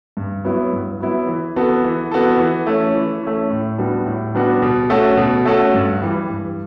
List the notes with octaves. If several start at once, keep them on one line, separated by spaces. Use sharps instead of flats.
G2
F#3 B3 E4
G2
F#3 B3 E4
E3
B3 F#4 A4
E3
B3 F#4 A4
E3
A3 C#4
E3
A3 C#4
A2
G3 B3 D4 F#4
A2
G3 B3 D4 F#4
B2
A3 C#4 F#4 A4
B2
A3 C#4 F#4 A4
G2
E3 G3
G2